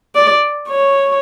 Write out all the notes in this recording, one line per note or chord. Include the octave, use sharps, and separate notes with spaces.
D5
C#5